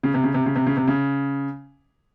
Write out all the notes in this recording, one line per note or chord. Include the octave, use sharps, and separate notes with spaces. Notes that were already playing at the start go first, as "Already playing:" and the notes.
C#3
C3
C#3
C3
C#3
C3
C#3
C3
C#3